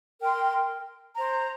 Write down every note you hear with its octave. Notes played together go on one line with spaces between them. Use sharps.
A#4 G5 C6
C5 A#5